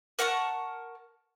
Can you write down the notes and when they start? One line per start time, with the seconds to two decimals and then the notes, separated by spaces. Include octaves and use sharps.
0.19 A#4 F#5 A5 C#6